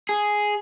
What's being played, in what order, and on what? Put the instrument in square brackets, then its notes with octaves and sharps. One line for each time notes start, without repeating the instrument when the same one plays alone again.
[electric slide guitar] G#4